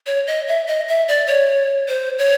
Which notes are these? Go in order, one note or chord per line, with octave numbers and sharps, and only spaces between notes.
C#5
D#5
E5
D#5
E5
D5
C#5
C5
C#5